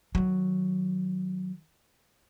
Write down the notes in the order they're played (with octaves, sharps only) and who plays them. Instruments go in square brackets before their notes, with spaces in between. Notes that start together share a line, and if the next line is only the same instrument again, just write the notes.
[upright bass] D#3 F#3